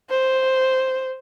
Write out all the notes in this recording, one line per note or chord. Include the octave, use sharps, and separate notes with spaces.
C5